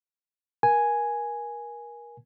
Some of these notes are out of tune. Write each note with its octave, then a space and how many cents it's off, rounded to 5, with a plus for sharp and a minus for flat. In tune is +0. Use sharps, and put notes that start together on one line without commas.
A#4 +30 G#5 +0